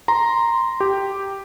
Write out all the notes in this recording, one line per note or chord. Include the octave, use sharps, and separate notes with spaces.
A#5 C6
G4